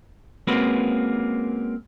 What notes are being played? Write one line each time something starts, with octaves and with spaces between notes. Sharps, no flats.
G#3 A#3 C4 C#4 F#4 B4